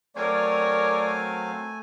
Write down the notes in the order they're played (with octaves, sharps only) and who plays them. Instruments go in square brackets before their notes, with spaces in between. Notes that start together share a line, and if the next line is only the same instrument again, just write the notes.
[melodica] F#3 C4 F5 [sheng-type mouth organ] A3 G#5 [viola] A#4 C#5 [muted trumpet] D5